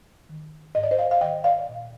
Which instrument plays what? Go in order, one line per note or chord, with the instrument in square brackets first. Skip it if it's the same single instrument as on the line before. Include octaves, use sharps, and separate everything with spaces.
[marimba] D#3
G#2 D#5
D5
C5 D#5
D5 F5
F5
D#3 D#5 G5
D5 F5
A#2